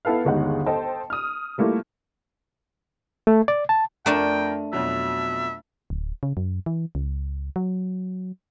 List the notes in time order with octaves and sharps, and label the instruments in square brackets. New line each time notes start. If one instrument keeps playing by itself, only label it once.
[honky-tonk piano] B3 E4 A4 B4 F5
G1 D#2 G#3 D#4 F5 F#5
A4 C5 D#5 G5 A5
D#6 F6
G3 A3 A#3 E4 F4
[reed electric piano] A3
D5
A5
[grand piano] F2 A#4 D#7 [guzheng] A3 D4 A5 [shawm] G5
[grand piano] F2 B2 F#3 [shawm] E5
[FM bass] D1
C#3
F#2
E3
C#2
F#3